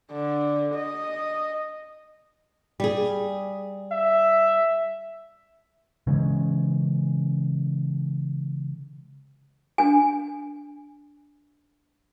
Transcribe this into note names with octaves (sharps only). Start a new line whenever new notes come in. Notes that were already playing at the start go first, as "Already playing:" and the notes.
D3
D#5
G3 G#4
E5
C#3 E3 G#3 C#4
D4 G#5